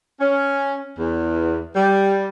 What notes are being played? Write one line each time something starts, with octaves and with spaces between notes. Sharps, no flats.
C#4
E2
G3